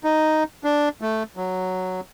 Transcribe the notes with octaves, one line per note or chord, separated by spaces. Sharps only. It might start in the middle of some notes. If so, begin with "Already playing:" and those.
D#4
D4
A3
F#3